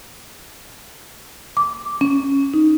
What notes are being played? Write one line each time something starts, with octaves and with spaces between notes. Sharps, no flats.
D6
C#4
D#4